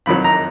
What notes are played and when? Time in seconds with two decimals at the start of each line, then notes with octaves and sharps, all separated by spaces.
0.06 F2 D#3 F#3 B5
0.24 A#5